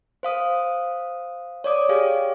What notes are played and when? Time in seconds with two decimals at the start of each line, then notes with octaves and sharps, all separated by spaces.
0.23 C5 F5 D#6
1.64 C#5 D5 D6 D#6
1.89 G4 G#4 C#5 F5